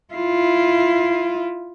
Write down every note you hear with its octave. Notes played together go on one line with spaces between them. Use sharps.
E4 F4